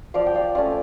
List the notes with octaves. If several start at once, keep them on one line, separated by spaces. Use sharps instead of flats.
F3 D5 F5
G5
D5 F5
A3 C#4 F4 D5 F5